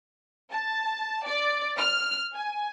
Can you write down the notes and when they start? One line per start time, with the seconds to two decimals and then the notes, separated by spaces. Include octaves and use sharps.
0.52 A5
1.26 D5
1.77 F6
2.36 G#5